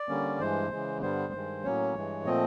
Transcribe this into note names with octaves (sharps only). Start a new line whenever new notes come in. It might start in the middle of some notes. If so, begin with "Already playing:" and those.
Already playing: D5
D3 G3 A#3 C#4
G2 E3 G#3 C5
C#3 E3 G#3
G2 D3 G3 B3 C5
G2 D#3 G#3
A2 F#3 A#3 C#4 C#5
G2 E3 G#3
A#2 F3 A3 C4 D#5